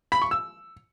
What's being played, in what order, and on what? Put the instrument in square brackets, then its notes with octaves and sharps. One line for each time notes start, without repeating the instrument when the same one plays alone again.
[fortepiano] B5
C#6
E6